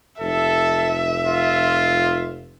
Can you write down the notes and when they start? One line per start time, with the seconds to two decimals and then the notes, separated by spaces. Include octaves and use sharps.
0.20 F1 A4 E5
1.27 F4